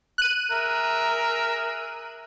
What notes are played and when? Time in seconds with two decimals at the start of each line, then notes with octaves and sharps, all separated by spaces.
0.18 F#6 D#7
0.51 G#4 A#4 E5